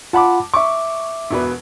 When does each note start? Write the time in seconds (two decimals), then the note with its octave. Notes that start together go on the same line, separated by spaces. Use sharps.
0.13 F4 F#5 A5 B5 D6
0.54 E5 C#6 D6
1.31 E1 B2 B4